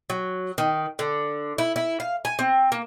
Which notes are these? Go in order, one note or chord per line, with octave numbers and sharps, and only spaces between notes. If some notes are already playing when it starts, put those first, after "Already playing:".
F#3
D#3
D3
E4
E4
F5
G#5
C4
A#3